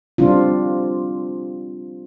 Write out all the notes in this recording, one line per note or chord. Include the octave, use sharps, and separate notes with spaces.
G3 C4 D4 F4